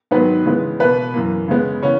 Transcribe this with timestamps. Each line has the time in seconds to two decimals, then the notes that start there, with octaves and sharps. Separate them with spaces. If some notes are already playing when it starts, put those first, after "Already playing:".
0.11 G#2 D#3 F#3 B3 B4
0.45 C#3 E3 G#3 B3
0.80 B2 A#3 B3 B4
1.14 F#2 E3 A#3
1.48 C#3 G#3 B3
1.83 C#3 E3 B3 C#4 C#5